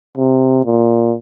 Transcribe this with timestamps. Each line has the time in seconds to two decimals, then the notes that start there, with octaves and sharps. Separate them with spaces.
0.18 C3
0.66 A#2